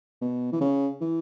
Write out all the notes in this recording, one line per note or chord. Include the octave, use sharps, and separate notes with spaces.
B2
E3
C#3
E3